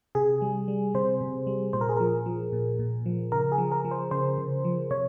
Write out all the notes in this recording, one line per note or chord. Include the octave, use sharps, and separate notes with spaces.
C3 G#4
G3
G3
C3 C5
C3
G3
A#2 C5
A#4
G#4
F3 A#4
F3
A#2
A#2
F3
C#3 A#4
G#4
F3
A#4
F3
C5
C#3 C5
C#3
F3
C3 C#5